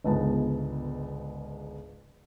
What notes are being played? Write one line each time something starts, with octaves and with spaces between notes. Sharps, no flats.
G1 C#2 G#2 B3 A5